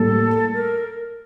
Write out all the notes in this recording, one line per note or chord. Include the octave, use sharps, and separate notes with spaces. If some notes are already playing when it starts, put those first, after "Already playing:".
Already playing: A2 G3 A#3 A4
A#4